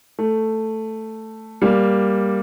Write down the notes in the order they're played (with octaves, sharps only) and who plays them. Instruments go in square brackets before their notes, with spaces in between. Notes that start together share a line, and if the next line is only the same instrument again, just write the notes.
[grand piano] A3
G3 A#3